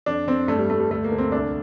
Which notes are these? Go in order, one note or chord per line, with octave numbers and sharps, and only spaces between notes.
F2 D4
F2 C4
G2 A3
G3
G2 A3
G3
D2 A3
A#3
D2
C4
C2 D4